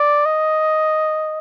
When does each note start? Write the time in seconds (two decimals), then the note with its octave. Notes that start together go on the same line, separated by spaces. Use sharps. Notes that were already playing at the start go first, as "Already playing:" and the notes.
Already playing: D5
0.26 D#5